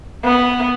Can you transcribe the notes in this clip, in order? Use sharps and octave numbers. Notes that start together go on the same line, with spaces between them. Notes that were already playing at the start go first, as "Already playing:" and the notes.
B3